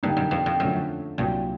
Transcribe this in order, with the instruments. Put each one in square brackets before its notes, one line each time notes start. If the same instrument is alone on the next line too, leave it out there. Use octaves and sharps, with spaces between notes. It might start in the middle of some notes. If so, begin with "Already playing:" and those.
[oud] G2 [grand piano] D3 G3 A#3 D#4
[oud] F#2
F2
F2
[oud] F#2 [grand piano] D3 F3 A3 C#4
[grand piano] C2 A#2 F#3 [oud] G2